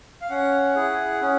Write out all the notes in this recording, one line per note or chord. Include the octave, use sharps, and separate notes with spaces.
F5
C#4 F#5
E4 G#4
C#4